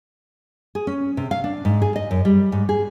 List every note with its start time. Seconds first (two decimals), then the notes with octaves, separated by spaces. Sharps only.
0.75 G#4
0.87 C#4
1.17 C3
1.31 F5
1.44 D4
1.65 G#2
1.82 G#4
1.96 D#5
2.11 F#2
2.25 G3
2.52 G#2
2.69 G#4